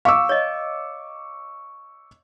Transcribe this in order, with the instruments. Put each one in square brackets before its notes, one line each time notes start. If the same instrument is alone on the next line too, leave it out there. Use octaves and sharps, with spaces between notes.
[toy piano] F5 [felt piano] C#6 D6 E6
[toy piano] C#5 D#5